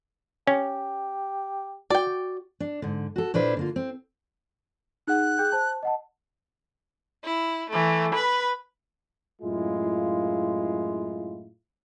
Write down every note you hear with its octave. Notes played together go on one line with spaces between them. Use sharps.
C#4 G4
F#4 D5 G5
D4
G#2 D3
F#4 A4
A#2 D4 E4 B4 C5
D3 A#3 F4
C4
D#4 G#4 F#5 F#6
G#4 G5 G6
C5 A5
D#5 F#5 A5
E4
E3 A3
B4 B5
F#2 A2 G#3 E4 F4